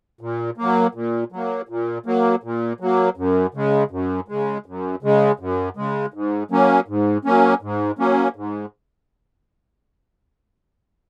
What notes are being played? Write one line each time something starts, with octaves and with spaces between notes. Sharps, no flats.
A#2
F#3 A#3
A#2
F#3 A#3
A#2
F#3 A#3
A#2
F#3 A#3
F#2
C#3 G#3
F#2
C#3 G#3
F#2
C#3 G#3
F#2
C#3 G#3
G#2
F#3 A#3 C#4
G#2
F#3 A#3 C#4
G#2
F#3 A#3 C#4
G#2